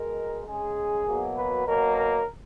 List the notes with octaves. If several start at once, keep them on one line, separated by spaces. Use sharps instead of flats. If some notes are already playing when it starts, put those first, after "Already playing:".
Already playing: B2 G#3 A#4
C#3 G#3 G#4
B2 F#3 A#3
B4
B2 F#3 A#3 A#4
A#4